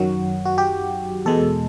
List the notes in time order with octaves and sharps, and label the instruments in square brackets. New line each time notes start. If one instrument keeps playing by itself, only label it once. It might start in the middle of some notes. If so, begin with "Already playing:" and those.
Already playing: [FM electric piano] F#2 D#3 F#3 F#4
F#4
G4
E2 B2 G#3 A4